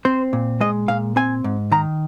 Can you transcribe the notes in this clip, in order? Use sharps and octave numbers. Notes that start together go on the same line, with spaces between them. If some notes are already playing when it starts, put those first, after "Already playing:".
C4 C5
A#2
G#3 D#5
A#2 F5
C4 G#5
G#2
D#3 A#5